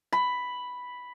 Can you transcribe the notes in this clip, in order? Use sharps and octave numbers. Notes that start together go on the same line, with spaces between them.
B5